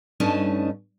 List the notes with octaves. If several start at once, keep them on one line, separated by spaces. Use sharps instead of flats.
G2 A3 C#4 D#4 D#5 A5